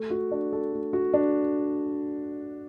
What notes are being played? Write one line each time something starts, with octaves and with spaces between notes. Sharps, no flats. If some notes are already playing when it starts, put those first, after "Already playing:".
Already playing: A3
F#4
D4
A4
A3
F#4
D4